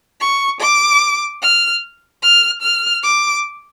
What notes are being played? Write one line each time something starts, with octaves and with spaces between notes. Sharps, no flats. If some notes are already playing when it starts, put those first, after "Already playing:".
C#6
D6
F6
F6
F6
D6